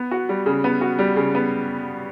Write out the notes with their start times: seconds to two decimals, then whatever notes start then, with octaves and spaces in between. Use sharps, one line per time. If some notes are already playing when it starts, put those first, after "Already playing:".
Already playing: B3
0.11 F#4
0.29 G3
0.46 C#3
0.64 B3
0.81 F#4
0.99 G3
1.16 C#3
1.35 B3